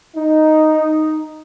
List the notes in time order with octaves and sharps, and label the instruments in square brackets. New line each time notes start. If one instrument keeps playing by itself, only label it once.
[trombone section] D#4